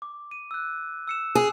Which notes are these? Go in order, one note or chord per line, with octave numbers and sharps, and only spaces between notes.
D6
D#7
E6 F#6
E6 C#7 E7
G#4